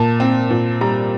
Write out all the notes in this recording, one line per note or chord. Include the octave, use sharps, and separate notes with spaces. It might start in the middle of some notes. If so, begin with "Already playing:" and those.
Already playing: A#2 A5
C4
A#2
G3 A#5